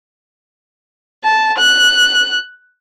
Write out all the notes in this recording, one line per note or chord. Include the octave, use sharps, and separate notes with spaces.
A5
F#6